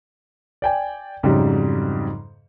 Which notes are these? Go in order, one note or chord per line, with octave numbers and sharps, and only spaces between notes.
D5 G5 G#5
F2 G#2 C#3 F#3 G3